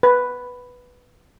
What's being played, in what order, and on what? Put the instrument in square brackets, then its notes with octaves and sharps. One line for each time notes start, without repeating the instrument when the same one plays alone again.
[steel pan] B4